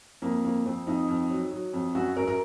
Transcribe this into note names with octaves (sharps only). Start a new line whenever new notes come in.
F2 A#3
F2 A#3
F2 C4
F2 D#4
F2
F#3
F#3
F2
F#2 F#4
F#2 A#4
A#4